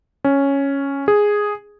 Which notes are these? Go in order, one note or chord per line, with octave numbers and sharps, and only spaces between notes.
C#4
G#4